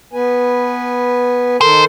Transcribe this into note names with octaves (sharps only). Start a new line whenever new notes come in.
B3 B4 G#5
D#3 A4 A#4 C5